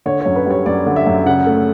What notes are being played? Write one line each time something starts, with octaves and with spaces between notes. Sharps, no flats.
D3 C#5
F#2 C#5
B4
G3 C#5
F#2 D5
D3
E5
F#2
C#3 F#5
A3